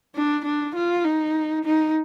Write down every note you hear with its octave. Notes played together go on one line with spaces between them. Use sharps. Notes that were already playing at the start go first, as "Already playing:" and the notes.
D4
D4
F4
D#4
D#4